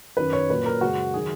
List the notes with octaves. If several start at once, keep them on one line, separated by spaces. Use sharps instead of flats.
F#2 D#3 F#3 B4
C#5
A#2 F#3 B4
A#4
F#2 C#3 G#3 F#4
D#3 F#3 G#4